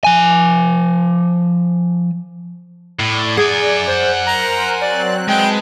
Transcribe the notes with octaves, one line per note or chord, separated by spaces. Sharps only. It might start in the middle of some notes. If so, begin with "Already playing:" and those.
F3 G#5
A2 D5
G#4 F#5 G#5
C5
A#4 C5 A#5 F#6
F#3 C4 D5 F#6
G#3 B4 G5 A5